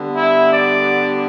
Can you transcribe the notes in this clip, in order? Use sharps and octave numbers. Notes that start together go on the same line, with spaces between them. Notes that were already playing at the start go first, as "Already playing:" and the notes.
Already playing: D3 G3 B3
E4
D5